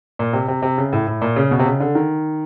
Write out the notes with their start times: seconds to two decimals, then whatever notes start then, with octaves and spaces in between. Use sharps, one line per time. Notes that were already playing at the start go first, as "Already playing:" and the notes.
0.19 A#2
0.33 C3
0.48 C3
0.62 C3
0.78 C#3
0.93 A2
1.07 A2
1.22 A#2
1.36 C#3
1.51 B2
1.59 C3
1.65 C#3
1.80 D3
1.95 D#3